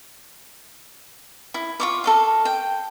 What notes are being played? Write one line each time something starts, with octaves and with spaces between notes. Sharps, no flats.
E4
F4 C#6 D6
A4 D#5 F5
G5